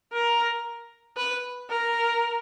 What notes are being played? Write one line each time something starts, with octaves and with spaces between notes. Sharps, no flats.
A#4
B4
A#4